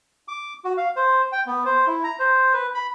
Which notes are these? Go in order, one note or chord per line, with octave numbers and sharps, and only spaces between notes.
D6
F#4
F5
C5
G5
B3
C5
E4
A#5
C5
B4
B5